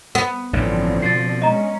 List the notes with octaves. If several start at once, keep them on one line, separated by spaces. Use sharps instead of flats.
B3
A1 G2 D3 F3 C4
B2 A6 C7
G#3 C#4 D#5 A#5